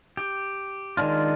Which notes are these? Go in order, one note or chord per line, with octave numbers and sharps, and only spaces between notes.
G4
D#3 G#3 D4 F4